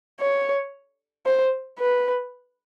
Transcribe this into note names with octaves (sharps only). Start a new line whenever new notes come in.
C#5
C5
B4